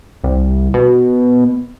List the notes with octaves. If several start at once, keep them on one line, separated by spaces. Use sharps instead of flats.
C2
B2